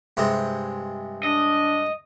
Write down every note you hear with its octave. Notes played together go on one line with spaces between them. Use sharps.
G2 C3 G#3
D4 D#5